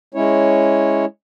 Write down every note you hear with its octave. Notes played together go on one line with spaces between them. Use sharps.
G#3 C#4 E4 C#5